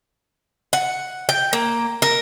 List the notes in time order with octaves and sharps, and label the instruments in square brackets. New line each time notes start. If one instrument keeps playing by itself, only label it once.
[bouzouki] F#5
G5
A#3
A#4